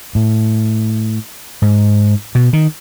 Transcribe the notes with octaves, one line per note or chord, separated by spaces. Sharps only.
A2
G#2
B2
D#3